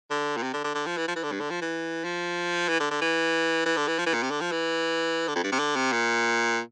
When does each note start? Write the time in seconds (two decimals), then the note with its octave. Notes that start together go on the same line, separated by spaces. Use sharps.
0.11 D3
0.37 A#2
0.43 C3
0.53 D3
0.64 D3
0.75 D3
0.86 F3
0.97 E3
1.08 F3
1.16 E3
1.23 D3
1.32 G2
1.40 D3
1.50 F3
1.61 E3
2.04 F3
2.68 E3
2.80 D3
2.91 D3
3.01 E3
3.66 E3
3.77 D3
3.88 E3
3.98 F3
4.06 E3
4.14 A#2
4.23 C3
4.31 D3
4.41 F3
4.51 E3
5.28 D3
5.35 F2
5.44 G2
5.52 C3
5.59 D3
5.76 C3
5.92 A#2